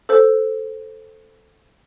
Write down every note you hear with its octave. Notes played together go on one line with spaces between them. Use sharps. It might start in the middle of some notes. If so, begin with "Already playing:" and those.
A4 C5